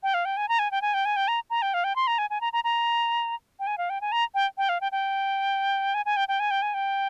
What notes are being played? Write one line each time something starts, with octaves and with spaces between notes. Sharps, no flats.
G5
F5
G5
G#5
A#5
G#5
G5
G#5
G5
G#5
G5
A#5
A#5
G5
F5
G5
C6
A#5
G#5
G#5
A#5
A#5
A#5
G5
G#5
F5
G5
G#5
A#5
G5
G5
F5
G5
G5
G#5
G#5
G5
G5
G#5
G5
G#5
G5